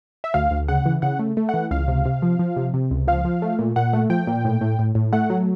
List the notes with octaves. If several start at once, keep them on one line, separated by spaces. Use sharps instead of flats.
E5
D2 F5
D2
C#3 F#5
E3
C#3 F#5
A3
A3
F#5
E3
C#2 F5
C3
C3
F3
F3
C3
C3
C#2
F3 F5
F3
A3
A#2
A#2 F#5
A3
F3 G5
A#2
A2
A2
A2
A2
A3 F#5
F#3